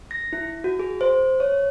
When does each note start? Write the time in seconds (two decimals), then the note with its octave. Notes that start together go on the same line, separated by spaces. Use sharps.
0.11 A#6
0.33 E4
0.64 F#4
0.79 G#4
1.01 C5
1.40 C#5